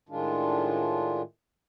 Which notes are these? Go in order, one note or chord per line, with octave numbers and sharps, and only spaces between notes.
A2 D#3 G#3 D4 F4